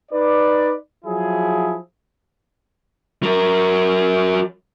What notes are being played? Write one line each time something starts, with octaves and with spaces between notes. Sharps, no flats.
D#4 B4 D5
F3 F#3 E4 G#4
F#3 A#4